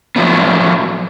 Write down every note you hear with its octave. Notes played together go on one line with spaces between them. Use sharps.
A2 F3 F#3 A3 B3